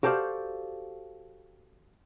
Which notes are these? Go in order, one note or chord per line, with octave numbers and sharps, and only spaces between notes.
F#4 G4 A4 C5 D5 F5